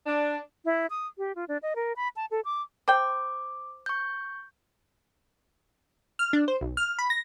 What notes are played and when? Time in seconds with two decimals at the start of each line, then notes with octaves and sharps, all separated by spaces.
0.07 D4
0.65 E4
0.90 D#6
1.18 G4
1.36 F4
1.48 D4
1.63 D#5
1.76 A#4
1.96 B5
2.16 A5
2.31 A4
2.45 D6
2.88 C5 G5 D6
3.86 C#6 G6
6.19 F6
6.33 D4
6.48 C5
6.61 B1
6.77 F6
6.99 B5
7.10 A#6